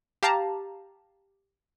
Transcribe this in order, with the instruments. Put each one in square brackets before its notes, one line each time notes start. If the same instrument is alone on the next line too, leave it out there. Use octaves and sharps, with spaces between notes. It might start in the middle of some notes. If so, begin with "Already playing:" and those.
[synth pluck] G4 F5 A5 A#5